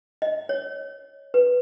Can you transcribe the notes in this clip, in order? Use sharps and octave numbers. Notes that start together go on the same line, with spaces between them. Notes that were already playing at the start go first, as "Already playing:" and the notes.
D#5
C#5
B4